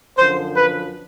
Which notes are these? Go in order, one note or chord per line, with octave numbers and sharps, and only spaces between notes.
F#2 D3 F3 C5
B4